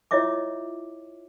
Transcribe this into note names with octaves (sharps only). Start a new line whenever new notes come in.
E4 F4 C#5 D#5 E5 D6